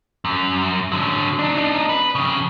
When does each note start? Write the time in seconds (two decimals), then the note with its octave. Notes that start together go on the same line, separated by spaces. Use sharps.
0.25 F#2
0.92 D3 F#3
1.39 D4 D#4
1.89 B4
2.15 F2 C#3